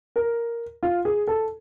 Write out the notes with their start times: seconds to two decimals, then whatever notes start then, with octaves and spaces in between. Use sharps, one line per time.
0.16 A#4
0.83 F4
1.05 G#4
1.27 A4